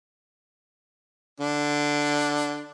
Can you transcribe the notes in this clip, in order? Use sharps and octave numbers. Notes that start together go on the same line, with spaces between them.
D3 D4